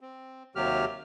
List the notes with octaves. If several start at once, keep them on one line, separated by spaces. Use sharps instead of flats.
C4
D#2 C3 F#3 G4 F6